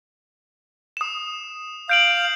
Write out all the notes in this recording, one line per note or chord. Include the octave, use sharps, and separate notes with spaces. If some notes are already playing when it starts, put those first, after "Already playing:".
D#6 E7
F5 G6 D7 F#7